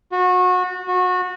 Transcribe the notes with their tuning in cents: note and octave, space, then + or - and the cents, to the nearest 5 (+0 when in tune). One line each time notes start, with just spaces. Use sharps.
F#4 -25
F#4 -25